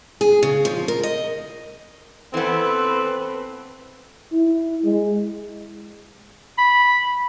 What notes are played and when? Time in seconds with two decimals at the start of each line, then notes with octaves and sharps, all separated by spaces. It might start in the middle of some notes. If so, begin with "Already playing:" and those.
0.21 G#4
0.43 C#3
0.65 F3
0.88 A#4
1.03 D#5
2.34 E3 B3 C4 A4 B4
4.32 E4
4.84 G#3
6.58 B5